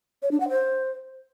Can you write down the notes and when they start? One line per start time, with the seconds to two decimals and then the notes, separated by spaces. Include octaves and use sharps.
0.23 C#5
0.31 D4
0.40 F#5
0.49 C5